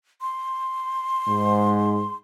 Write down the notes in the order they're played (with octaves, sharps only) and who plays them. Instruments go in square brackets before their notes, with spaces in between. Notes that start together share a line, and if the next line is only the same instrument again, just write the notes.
[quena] C6
[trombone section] G#2